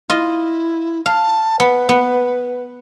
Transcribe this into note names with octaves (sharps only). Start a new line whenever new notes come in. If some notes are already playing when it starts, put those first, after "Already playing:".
E4 F4 D#5
F5 A5
B3 B4
B3